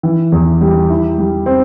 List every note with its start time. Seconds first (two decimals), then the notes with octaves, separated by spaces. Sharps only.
0.03 E3
0.32 E2
0.61 G3
0.90 E4
1.18 G3
1.46 C4